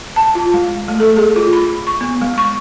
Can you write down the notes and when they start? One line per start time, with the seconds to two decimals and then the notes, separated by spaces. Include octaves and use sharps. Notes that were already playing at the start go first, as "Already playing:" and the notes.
0.16 A5
0.35 F4
0.54 G#3
0.88 A3
1.00 A4
1.16 G#4
1.36 F4
1.53 B5
1.87 C#6
2.01 B3
2.21 G#3
2.38 C#6